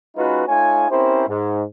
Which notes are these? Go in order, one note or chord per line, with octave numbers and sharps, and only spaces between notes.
G#3 C#4 D#4 F4 F#4 B4
A3 D#4 F4 C#5 G#5
C4 C#4 E4 G4 A#4 C5
G#2